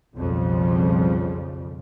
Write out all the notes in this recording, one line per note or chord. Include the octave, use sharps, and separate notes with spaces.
B1 F2 C#3 F3 G3